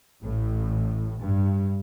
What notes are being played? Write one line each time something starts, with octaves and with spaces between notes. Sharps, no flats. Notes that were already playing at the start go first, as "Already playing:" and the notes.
A1 A2
G2